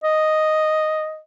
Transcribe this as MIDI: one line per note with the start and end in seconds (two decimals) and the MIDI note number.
0.04 1.19 75